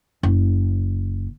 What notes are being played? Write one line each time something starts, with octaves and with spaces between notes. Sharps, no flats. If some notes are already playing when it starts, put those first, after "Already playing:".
F#1